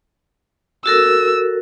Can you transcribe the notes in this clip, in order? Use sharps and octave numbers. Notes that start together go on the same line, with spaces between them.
F#4 A4 A#4 E6